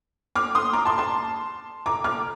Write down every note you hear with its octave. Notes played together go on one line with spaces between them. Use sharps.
D6 F6
C6 D#6
A#5 D6
A5 C6
A5 C6
A#5 D6
D6 F6